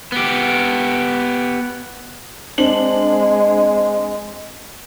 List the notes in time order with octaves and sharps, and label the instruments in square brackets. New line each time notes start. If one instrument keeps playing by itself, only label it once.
[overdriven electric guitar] B3 G4
[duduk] G#3 [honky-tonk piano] C4 D4 F#7